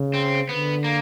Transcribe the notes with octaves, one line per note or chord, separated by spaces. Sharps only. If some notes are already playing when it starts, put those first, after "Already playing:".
Already playing: C#3
C4
D3 B3
A#3